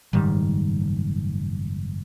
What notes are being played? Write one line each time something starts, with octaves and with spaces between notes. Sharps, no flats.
F#1 G#2 D#3 G3